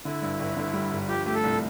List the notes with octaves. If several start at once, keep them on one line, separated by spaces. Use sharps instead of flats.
D3 E4
G2
G1
D3
G3
G1
F3 G4
A3 G4
A4
C2